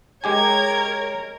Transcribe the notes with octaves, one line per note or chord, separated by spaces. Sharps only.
G#3 G4 A#4 C#5 G#5 G#6